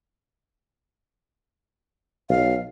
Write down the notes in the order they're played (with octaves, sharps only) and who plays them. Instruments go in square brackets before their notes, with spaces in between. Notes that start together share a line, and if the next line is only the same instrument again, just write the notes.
[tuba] B1 [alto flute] F5